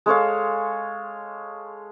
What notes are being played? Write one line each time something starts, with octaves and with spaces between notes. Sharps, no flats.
G#3 A4 C#5 F5